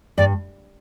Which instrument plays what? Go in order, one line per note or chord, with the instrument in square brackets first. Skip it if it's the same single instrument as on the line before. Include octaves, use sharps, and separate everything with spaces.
[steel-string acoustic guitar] G2 [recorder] D5